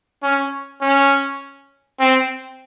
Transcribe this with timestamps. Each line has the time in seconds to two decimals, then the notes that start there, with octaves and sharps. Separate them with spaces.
0.23 C#4
0.82 C#4
2.00 C4